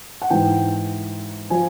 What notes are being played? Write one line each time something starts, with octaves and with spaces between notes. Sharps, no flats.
F#5
G#2 E3 G5
F3 G#5